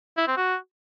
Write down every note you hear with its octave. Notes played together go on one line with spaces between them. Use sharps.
E4
C4
F#4